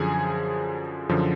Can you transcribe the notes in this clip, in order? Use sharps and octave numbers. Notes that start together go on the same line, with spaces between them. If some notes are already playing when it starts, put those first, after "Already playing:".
Already playing: F#2 D3 F3 G#4 G#5
F#2 D3 F3